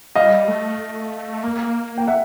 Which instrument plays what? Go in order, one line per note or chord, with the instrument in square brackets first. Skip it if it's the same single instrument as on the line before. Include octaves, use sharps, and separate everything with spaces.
[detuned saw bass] G3 [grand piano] D#5 F5
[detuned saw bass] A3
A#3
[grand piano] G5
E5 F#5